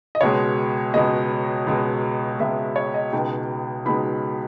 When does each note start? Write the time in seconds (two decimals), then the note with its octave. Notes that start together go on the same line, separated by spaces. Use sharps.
0.15 D#5
0.21 C#2 B2 G#3 C#5
0.94 C#2 B2 G#3 D#5
1.67 C#2 B2 G#3
2.39 C#2 B2 G#3 E5
2.76 C#5
2.94 D#5
3.13 C#2 B2 G#3 D#4 G5
3.85 C#2 B2 G#3 D#4 B5